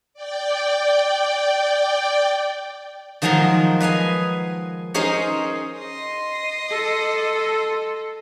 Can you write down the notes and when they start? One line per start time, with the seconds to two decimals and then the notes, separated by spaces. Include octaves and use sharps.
0.14 D5 G5
3.22 D#3 F3 F#3 G#3 D#4 A#4
3.80 B4 D#5 F5 G#5
4.94 C#4 D#4 G#4 A#4 C5 D#5
5.78 D#5 C6
6.71 A4